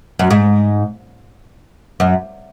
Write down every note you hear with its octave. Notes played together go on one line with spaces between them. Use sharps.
F#2
G#2
F#2